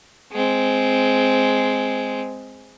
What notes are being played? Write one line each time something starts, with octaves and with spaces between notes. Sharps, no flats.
G#3 C4